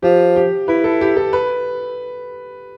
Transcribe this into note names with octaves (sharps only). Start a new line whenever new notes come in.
F3 G4
G4
E4 B4
A4
G4
A4
B4